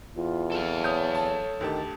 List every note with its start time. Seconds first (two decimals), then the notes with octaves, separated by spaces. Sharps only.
0.15 E2 F4
0.52 A4 F5
0.84 C#5 D#6 G6
1.15 A5
1.61 D2 D#3 G4 A5